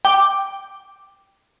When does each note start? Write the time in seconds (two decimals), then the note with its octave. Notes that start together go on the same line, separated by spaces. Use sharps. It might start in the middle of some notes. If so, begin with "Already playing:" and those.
0.05 G5 D6